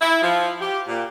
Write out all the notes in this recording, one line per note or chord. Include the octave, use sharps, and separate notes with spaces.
E4
F3
G4
A#2